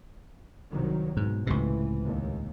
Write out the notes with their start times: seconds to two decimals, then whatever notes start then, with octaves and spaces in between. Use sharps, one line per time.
0.70 C2 D#3 F#3
1.17 G#2 B2
1.47 C#2 A2 C3 E3
2.05 D#2